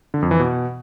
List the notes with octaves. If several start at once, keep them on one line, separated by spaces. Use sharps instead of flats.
D3
F2
E3
B2